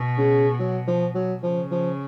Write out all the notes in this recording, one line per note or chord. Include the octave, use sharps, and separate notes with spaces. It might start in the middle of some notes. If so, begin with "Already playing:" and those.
Already playing: B2
C#3
F#3
F3
F#3
C#3 F3
F3